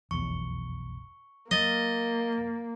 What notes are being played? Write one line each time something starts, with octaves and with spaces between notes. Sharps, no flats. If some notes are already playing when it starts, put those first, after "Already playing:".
F1 B1 E2 C#6
F#3 A#3 D#5 A6 A#6